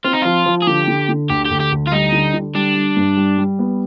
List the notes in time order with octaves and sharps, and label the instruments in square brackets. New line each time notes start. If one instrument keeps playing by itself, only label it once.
[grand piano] C4 [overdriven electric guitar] F4
[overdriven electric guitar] D#4
[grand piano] F3 [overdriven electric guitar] F4
[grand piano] F3
[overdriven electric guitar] G#4
[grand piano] D3 [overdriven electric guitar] G4
[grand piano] D3
D3
[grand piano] D2 [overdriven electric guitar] G4
[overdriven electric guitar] G4
[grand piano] D2
[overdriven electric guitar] G4
[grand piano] D2
[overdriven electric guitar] F4
[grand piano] G3 [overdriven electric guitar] D#4
[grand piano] D3
D3
[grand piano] G3 [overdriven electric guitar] D4
[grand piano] G3
G2
G3
G3
B3